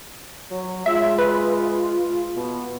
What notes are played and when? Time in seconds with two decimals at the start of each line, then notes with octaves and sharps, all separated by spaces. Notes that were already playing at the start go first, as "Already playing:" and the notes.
0.51 F#3
0.86 G#3 F4 E5
1.18 B4
2.36 B2